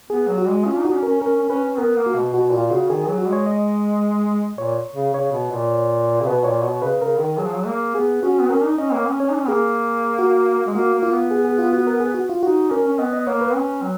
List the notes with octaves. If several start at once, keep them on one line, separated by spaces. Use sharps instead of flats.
B3 G#4
F#3
F#4
G#3
C#4 F4
D#4 F#4
C#4
A#4
C#4
C#4 A#4
C#4
C#4 B4
C#4
B3 A#4
A#3
F#4
B2
B2 F#4
A#2 F4
C#3 F#4
D#3 G#4
F#3 G#4
F#4
G#3
C#5
D#5
A#2 C#5
C#3
C#3 C#5
B2
A#2
C#3
B2 B4
A#2 C#5
B2 C#5
C#3 B4
C#3 A#4
D#3 A#4
F#3 G#4
F3
F#3
A#3
B3 G#4
C#4 F#4
B3
C#4 A#4
D#4
C#4 D#5
A#3 C#5
C#4
C#4 C#5
D#4
C#4
A#3 G#4
F#4
G#3
A#3 F#4
A#3
F4
B3
G#4
G#4
F4
F#4
A#4
G#4
F#4
F4
D#4 F#4
C#4 A#4
C#4
B3 D#5
D#5
A#3 C#5
B4
C#4
F#3